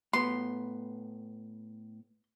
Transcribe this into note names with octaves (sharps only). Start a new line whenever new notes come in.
A2 B3 C6